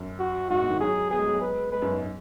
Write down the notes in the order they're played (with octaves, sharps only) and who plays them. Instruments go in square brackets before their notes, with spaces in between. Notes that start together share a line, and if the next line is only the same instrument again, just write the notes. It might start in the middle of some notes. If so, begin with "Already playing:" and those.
Already playing: [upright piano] F#2
[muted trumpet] F#4
[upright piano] G#2 [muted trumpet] F#4
[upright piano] B2
D#3
[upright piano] F#3 [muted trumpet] G#4
[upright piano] B3 [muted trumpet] G#4
[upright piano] G#3
F#3
G#3
[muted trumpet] B4
[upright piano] G#3 [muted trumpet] B4
[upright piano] F#2
G#2